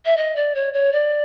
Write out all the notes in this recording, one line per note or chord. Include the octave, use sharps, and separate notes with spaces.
E5
D#5
D5
C#5
C#5
D5